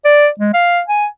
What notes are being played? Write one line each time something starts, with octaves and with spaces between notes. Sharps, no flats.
D5
G#3
F5
G#5